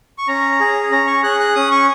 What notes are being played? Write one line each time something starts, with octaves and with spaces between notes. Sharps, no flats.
C#6
C#4 A#5
G#4
C#4 A#5
C#6
G#4 F#6
F#6
C#4 D#6
C#6